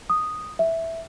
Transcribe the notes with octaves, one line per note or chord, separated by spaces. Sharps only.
D#6
E5